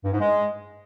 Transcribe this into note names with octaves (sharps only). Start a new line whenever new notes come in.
G2
G#2
G#3